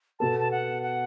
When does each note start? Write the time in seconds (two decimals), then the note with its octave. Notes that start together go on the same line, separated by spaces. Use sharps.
0.19 B2 B3 A4 A5
0.40 A5
0.51 F#5
0.82 F#5